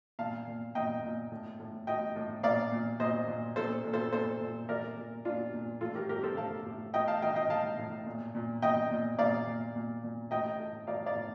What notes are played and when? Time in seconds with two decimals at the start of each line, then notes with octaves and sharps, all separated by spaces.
0.19 A#2 F5 A5
0.47 A#2
0.75 A#2 D#5 G5
1.03 A#2
1.32 A2
1.60 A2
1.87 A2 D#5 G5
2.16 A2
2.43 A#2 D5 F5
2.72 A#2
3.00 A#2 C5 D#5
3.28 A#2
3.56 A#2 A4 C5
3.84 A#2
3.93 A4 C5
4.13 A#2 A4 C5
4.41 A#2
4.69 A#2 A#4 D5
4.97 A#2
5.25 A#2 D4 F4
5.54 A#2
5.81 A2 F4 A4
5.95 G4 A#4
6.09 A2 G4 A#4
6.23 A4 C5
6.37 A2 F5 A5
6.66 A2
6.94 A2 D#5 G5
7.08 F5 A5
7.22 A2 D#5 G5
7.35 D#5 G5
7.49 A2 F5 A5
7.78 A2
8.06 A#2
8.35 A#2
8.62 A#2 D#5 G5
8.91 A#2
9.18 A#2 D5 F5
9.47 A#2
9.75 A#2
10.03 A#2
10.31 A2 D#5 G5
10.60 A2
10.87 A2 D5 F5
11.06 D5 F5
11.15 A2